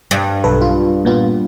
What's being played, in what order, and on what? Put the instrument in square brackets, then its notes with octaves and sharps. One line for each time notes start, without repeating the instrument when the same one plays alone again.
[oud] G2
[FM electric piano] B1 A4 B4
F4
A#2 B3 F4